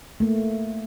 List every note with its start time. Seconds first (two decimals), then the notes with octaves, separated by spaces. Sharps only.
0.20 A3 A#3